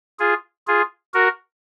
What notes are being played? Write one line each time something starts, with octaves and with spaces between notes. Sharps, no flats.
F4 G#4
F4 G#4
F#4 A#4